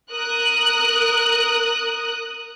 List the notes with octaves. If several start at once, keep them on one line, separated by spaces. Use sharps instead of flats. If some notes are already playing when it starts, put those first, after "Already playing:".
A#4 D#6 F#6